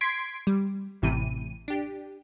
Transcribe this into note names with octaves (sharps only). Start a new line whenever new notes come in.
C6 G#6 B6 D7
G3
A1 A2 C3 E3 D#7
D4 G4